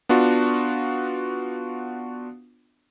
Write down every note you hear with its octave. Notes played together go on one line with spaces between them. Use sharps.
B3 D4 F4 F#4